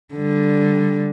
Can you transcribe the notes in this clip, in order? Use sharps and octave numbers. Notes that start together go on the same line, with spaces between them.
D3 G3